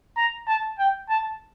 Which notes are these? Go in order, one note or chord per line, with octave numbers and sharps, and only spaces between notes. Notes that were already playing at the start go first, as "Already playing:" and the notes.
A#5
A5
G5
A5